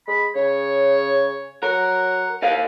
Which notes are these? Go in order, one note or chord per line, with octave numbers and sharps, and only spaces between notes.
G#3 B5
C#3 C#5
F#3 A#4 F#5
C2 A#4 D#5 F5